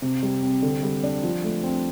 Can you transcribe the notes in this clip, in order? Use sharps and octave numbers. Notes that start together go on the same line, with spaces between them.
C3
G3
C4
D3
G3
D4
F3
A3
C4